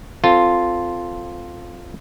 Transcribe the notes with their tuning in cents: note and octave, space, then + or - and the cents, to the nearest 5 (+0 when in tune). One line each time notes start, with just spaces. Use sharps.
C4 -15 F4 +0 A4 +0